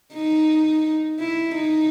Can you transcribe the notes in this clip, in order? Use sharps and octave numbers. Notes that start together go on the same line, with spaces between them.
D#4
E4
D#4